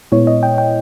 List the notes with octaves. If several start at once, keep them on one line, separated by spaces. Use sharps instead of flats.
A#2 G#3 B3 E4 C#5
D#5
G5
G5